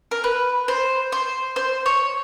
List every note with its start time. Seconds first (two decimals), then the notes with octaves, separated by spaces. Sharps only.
0.11 A#4
0.24 B4
0.68 C5
1.12 C5
1.56 C5
1.86 C#5